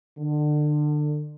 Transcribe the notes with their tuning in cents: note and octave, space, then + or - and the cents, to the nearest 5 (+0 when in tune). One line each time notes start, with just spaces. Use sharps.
D3 +30